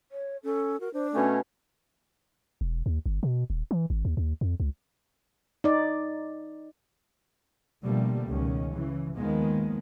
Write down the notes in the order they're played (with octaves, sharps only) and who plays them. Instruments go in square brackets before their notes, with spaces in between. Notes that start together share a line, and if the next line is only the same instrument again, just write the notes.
[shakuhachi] C#5
[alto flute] C#4 [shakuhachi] A4
[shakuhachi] F#4 [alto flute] A#4
[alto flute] D4 [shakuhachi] C5
[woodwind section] B2 A3 C#4 [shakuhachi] A4
[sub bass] E1
D#2
G1
B2
D#1
E3
G#1
D#2
D#2
F2
C#2
[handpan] D#4 D5
[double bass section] B2 D3 F3 G3 A3 A#3
C#2 B2 D#3 C#4
C#3 E3
D#2 D#3 F3 G#3 A#3 B3